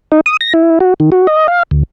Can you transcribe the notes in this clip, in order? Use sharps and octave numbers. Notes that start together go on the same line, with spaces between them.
D#4
D#6
A#6
E4
F#4
D#3
F#4
D#5
F5
D2